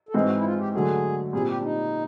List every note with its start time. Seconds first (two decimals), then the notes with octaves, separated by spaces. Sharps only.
0.09 A4
0.14 G#2 E3 G#3 C4 G#4
0.24 F#4
0.37 E4
0.44 F4
0.58 G4
0.74 D3 F#3 A3 G#4
1.32 A#2 G3 C4 G#4
1.48 G4
1.58 D4
1.62 D#4